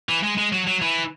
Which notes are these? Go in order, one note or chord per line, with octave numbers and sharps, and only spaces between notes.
E3
G#3
G#3
F#3
F#3
E3